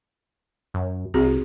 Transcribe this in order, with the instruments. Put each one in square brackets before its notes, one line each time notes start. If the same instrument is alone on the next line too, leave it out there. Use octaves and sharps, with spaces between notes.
[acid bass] F#2
[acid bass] C2 [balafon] C4 F#4 G#4